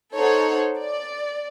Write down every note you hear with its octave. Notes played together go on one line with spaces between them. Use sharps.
D#4 A4 C5 C#5 F#5
D5